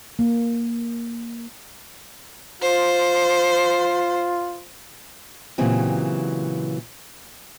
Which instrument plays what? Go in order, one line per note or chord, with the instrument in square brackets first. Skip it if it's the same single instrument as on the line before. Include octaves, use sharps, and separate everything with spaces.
[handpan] A#3
[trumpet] F4 [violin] C5
[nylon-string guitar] A#2 C#3 E3 F#3 C4 G4